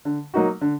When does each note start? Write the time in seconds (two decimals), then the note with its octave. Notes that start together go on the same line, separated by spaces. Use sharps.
0.05 D3
0.34 F#3 A#3 D#4 F#4
0.61 D3